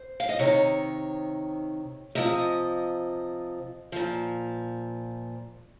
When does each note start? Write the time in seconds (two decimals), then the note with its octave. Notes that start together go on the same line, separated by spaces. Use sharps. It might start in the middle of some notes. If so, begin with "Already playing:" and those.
Already playing: C5
0.20 F5
0.29 D#5
0.39 C3 D#3 C#5
2.15 C3 F3 D#5
3.92 A#2 F3